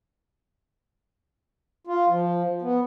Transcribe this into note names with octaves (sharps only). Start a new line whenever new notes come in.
F4
F3
B3